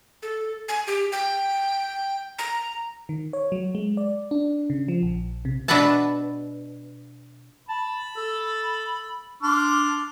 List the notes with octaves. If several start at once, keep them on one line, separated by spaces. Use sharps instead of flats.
A4
G#5
G4
G5
A#5
D#3
C#5
F#3
G#3
D5
D4
C#3
F3
A#1
C3
B2 D4 B4 E5 F#5 A5
A5 B5
A4
D4 C6 D6 F6